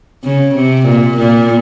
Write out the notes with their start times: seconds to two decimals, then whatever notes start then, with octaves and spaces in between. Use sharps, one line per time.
0.24 C#3
0.55 C3
0.86 A#2
1.17 A#2